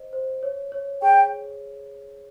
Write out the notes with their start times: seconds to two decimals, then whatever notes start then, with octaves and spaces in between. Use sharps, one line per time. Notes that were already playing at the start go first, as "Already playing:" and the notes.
Already playing: C5 D#5
0.13 C5
0.43 C#5
0.72 C#5
1.02 G#4 G5